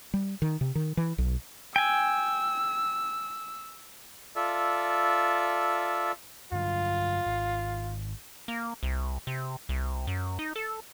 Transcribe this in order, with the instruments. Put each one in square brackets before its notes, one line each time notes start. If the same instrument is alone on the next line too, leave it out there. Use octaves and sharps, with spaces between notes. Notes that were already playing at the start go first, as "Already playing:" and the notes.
[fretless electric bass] G3
D#3
C3
D#3
E3
B1
[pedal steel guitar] G5 G#5 [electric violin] E6
[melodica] F4 A4 D5 E5
[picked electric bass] G2 D3 F#3 [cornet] F4
[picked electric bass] G#1
[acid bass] A#3
C2
C3
C2
F#2
D#4
A4